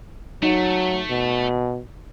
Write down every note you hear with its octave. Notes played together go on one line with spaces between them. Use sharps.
F#3 A3 D#4
B2